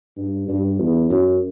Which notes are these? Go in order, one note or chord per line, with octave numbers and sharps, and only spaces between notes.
G2
G2
E2
F#2